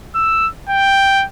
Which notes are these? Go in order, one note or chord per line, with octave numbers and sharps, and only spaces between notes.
E6
G5